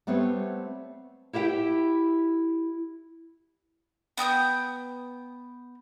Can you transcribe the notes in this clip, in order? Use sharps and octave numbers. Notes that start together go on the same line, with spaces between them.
G3 A3 B3 C4 C#5
E4 G4 E5 F5 G5
B3 G5 D#6 G6